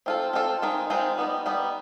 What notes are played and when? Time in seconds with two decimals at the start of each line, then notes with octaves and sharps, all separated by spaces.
0.06 C4 F4 A4
0.33 C4 F4 A4
0.62 D#3 G#3 C4 F4
0.90 D#3 G#3 C4 F4
1.18 G3 B3 D#4
1.46 G3 B3 D#4